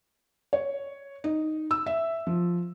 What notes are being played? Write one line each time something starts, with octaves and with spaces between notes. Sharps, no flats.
C#5
D#4
E6
E5
F3